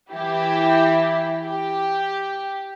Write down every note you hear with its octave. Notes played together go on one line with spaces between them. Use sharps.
E3 E4 G4
G4